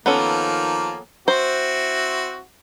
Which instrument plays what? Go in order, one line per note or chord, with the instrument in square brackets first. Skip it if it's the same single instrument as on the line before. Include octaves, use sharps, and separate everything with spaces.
[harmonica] D#3 F3 A#3 [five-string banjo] B3 C#4 A4
[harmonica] C4 E4 F#4 [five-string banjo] C5